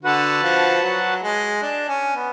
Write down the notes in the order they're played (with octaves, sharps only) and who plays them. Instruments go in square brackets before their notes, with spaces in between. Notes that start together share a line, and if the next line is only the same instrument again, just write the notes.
[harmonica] D3 [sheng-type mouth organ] F#4 B4 F#5 A5
[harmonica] F3
F#3
G#3
D4
C#4
B3